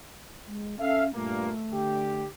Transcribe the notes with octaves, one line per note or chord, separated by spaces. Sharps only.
G#3
C#4 A4 E5 F5
G2 A#2 A3 A#3
D3 G4